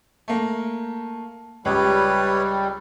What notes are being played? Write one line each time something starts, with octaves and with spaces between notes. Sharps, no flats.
A3 A#3
C#2 G3 B4 C#5